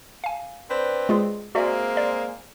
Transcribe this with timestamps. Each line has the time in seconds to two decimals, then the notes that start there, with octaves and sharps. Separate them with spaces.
0.24 F5 G#5
0.69 C4 D4 B4
1.09 G#3 F4 G#4
1.55 G#3 A#3 C4 F#4 D5 E5
1.97 D5